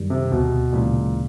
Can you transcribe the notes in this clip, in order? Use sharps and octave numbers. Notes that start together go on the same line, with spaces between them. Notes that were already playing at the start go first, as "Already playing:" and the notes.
Already playing: F#2 D#3 G3
C3
D2 B2
A#2 C#3 E3 G#3